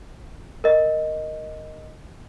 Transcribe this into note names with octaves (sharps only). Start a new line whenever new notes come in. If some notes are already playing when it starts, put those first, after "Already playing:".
A#4 D#5